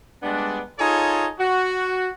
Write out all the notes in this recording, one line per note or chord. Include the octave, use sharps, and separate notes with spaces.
G3 G#3 B3 D4
D#4 F4 G#4 A4 C#5 A5
F#4